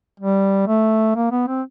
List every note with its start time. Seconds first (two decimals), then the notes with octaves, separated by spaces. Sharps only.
0.20 G3
0.68 A3
1.16 A#3
1.32 B3
1.48 C4